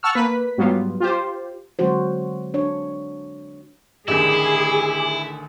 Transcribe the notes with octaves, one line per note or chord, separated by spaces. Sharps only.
F#5 A5 C#6 E6 F6
A#3 B4 B6
G#2 F#3 G3 B3 F4
F4 G4 C5
D3 F#3 G#3 C4 F#4 C5
D4 C#5
A1 D3 D#3 E4 G4 G#4